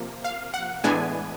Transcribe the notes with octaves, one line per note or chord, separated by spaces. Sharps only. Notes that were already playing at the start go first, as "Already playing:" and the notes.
Already playing: C3 F3 A#3
F5
F#5
A2 E3 G#3 B3 D4 G#5